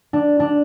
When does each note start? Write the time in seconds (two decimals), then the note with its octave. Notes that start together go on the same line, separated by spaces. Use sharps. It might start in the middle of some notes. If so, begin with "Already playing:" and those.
0.13 D4
0.40 D4